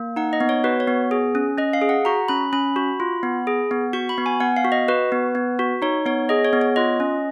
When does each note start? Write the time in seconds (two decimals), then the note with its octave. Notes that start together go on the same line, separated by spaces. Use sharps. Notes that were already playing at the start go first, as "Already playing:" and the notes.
Already playing: A#3
0.16 D#4 F#5
0.33 D#5
0.41 B3
0.49 C#5
0.64 F#4 B4
0.80 C#5
0.88 B3
1.11 G#4
1.35 C#4
1.58 C#4 D#5
1.73 F5
1.81 G#4
1.89 F#5
2.05 F#4 A#5
2.28 C#4 B5
2.53 C#4 B5
2.76 F#4
3.00 F4
3.23 B3
3.47 G#4
3.71 B3
3.93 F#4 C#6
4.09 B5
4.18 B3
4.26 G#5
4.40 B3 F#5
4.57 F5
4.65 F#4
4.72 D#5
4.88 F#4 B4
5.12 B3
5.35 B3
5.59 F#4
5.82 D#4 C#5
6.06 B3 C#5
6.29 G#4 D#5
6.45 C#5
6.53 B3
6.61 C#5
6.76 F4 D#5
7.00 C#4